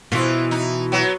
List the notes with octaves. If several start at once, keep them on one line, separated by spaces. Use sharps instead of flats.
B2 E3 F4
D#4
F#3 B3